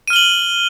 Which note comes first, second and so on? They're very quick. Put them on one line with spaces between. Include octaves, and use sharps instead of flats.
D#7 F6 G7 F#7